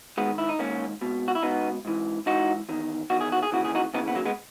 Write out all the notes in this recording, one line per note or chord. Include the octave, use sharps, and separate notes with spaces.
G#2 D#3 G#3 B3
E4
D#4
G#2 D#3 A#3 C#4
C#2 B2
F#4
E4
C#2 B2 B3 D#4
G#2 E3
G#2 E3 D#4 F#4
E2 D#3
E2 D#3 F#4
G#4
F#4
G#4
D#2 C#3 E3 F#4
G#4
D#4 F#4
D#2 C#3 E3 B3 D#4
B3
F#3 A#3
G#3 B3